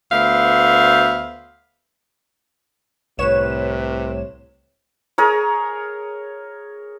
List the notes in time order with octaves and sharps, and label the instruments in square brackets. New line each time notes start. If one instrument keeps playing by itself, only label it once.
[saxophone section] D2 B3 C5 E5 F5
[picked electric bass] C2 A2 [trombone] C3 [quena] B4 [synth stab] C#5 E7
[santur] G#4 A#4 C#5